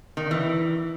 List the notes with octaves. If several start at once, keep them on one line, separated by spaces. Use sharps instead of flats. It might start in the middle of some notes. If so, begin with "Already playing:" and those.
D#3
E3